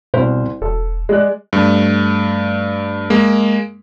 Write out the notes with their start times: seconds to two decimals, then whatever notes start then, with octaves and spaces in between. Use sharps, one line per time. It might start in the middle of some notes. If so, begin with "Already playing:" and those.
0.14 C2 B2 C5
0.62 E1 A4
1.09 G#3 D5 F#6
1.53 G2 A3
3.10 G#3 A#3